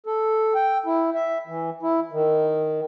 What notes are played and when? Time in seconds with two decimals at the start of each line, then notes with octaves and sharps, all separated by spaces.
0.06 A4
0.55 G5
0.86 E4
1.15 E5
1.47 E3
1.83 E4
2.12 D#3